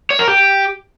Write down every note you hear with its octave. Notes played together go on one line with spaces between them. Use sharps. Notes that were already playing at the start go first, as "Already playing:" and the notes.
C#5
A#4
G4